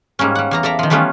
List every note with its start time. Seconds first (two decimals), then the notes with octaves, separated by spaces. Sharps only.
0.19 G#2 G3 A#3 C#4
0.35 G3 F#5
0.51 E2 A#3 A#5
0.63 A4 D5 E5 A#5
0.79 D#3 F3
0.90 E3 G3 A3 B3 C#4 F4